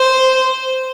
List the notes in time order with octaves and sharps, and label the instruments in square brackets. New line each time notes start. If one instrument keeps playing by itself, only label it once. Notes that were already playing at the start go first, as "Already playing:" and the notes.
Already playing: [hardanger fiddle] C5